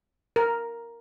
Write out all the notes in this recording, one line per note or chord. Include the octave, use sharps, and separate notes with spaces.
A#4